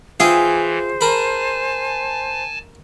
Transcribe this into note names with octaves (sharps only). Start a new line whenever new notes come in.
E3 F4 G#4 C5 E5 G5
A#4 G#5 A5 B5